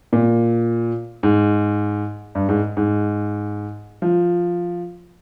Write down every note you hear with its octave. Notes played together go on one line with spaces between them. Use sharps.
A#2
G#2
G2
G#2
G#2
F3